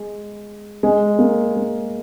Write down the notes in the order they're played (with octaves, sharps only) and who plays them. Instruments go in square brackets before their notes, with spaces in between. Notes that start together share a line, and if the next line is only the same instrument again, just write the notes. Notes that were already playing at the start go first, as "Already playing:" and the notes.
Already playing: [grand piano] G#3
G#3
A#3
G#3